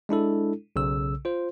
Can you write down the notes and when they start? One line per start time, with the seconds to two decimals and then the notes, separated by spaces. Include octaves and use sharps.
0.09 G#3 D4 E4 A4
0.76 B1 C#3 E6
1.25 F4 C5